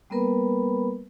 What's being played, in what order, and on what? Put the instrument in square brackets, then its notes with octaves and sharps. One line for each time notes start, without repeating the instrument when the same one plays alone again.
[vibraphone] G3 A#3 B3 A#4 B4 B5